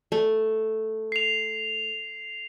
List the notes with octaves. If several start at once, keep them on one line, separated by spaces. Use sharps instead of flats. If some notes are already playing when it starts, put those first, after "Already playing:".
A3
C7 F7